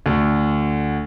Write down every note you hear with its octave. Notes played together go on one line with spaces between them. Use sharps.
D2